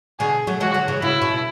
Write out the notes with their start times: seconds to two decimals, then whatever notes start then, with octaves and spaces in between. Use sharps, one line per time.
0.19 B2 D3 G#4
0.47 F#3 A3
0.60 E3 G#3 F#4
0.74 D3 F#3
0.88 C#3 E3
1.02 C#3 E4
1.22 B2